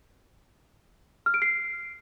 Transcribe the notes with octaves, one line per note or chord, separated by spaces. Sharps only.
F6
D7
C7